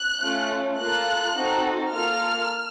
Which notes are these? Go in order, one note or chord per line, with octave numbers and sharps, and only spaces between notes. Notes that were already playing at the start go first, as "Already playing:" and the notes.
Already playing: F#6
A3 C#4 F4
A#3 F4 A4 F#6
C4 D#4 F#4 A4
A#3 F4 A4 F6